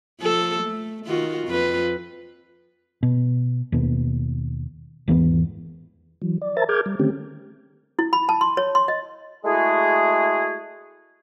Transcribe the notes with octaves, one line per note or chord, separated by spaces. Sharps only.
F3 A4
A3
D#3 F4 F#4
F2 F4 B4
B2
D#2 B2
G#1 E2 E3 B3
E3 F#3
D5
A#4 C5 E5 A5 A#5 A6
G#4 A#4 D6 F6 G6 G#6
G3
D3 D#3 A3 C4 C#4 G4
E4
B5
A5
C6
C#5
C6
D#5
G#3 A3 E4 F#4 G#4